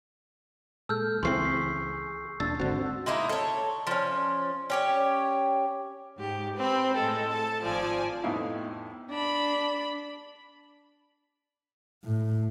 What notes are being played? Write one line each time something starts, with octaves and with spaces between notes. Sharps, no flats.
A#2 G#3 A4 E6 F6 G6
C#2 E3 C4 G#4 C6 C#6 C7
B6
D#1 D4 A5 E6
G#1 D3 C4 F#4 F#5
G#3 A#3 D#4 E4
A4 C#5
F3 C#4
C#4 G4 C#5
G#2 G4
C4 B4 B5
A2 G#3 A4
A5
G#1 F3 D5 G#5
F2 A2 B3 D#4 E4 F5
D4 B5
A2